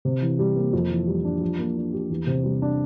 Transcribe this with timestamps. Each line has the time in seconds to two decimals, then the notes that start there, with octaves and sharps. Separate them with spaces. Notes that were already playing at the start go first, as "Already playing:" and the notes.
0.05 C3
0.22 E3
0.39 G3
0.56 A#3
0.73 F2
0.91 E3
1.07 G3
1.24 D4
1.41 F3
1.59 A#3
1.76 D4
1.93 G4
2.10 E2
2.27 C3
2.44 G3
2.62 D4